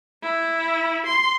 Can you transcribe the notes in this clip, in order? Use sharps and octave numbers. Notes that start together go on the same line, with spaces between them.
E4
C6